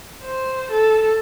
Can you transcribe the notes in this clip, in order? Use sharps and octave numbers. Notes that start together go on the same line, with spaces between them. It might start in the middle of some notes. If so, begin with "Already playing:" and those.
C5
A4